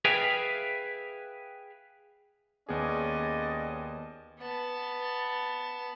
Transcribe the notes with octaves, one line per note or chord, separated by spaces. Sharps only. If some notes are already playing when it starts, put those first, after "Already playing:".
G#4 B4 E5 F5 G5 G#5
D#2 B3 C#4 G#4 D5 D#5
B3 A5